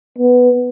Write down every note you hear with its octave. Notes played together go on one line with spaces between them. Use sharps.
B3